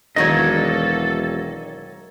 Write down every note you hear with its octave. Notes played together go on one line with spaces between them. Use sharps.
E1 D#3 F#3 A#3 A4 C#5 D#5